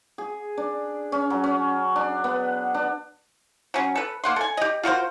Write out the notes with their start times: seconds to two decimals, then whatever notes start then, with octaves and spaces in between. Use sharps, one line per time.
0.18 G#4
0.58 D4
1.12 C#4
1.30 F#3
1.44 C#4
1.96 D4
2.24 B3
2.74 D4
3.74 F#3 C#4
3.95 A4 B4
4.24 A#3 F#5 C6
4.36 A4 G#5
4.57 G4 D#5
4.83 F4 F#4 A#4 C5